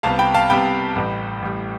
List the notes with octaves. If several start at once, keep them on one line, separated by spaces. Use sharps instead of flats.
C2 C3 G3 B3 F5 A5
G5 B5
F5 A5
C2 C3 G3 B3 G5 B5
A1 A2 G3
A1 A2 G3